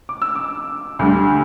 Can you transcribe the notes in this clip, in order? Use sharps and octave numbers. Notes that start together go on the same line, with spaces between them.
D6
E6
D6
D2 D3 G3